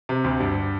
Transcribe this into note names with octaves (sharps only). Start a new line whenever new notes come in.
C3
D2
G2